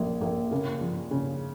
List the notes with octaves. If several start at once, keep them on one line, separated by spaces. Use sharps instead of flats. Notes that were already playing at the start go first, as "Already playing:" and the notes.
Already playing: A#1 F3 A#3
A#1 A#3
C#3 A#3
F3
C#3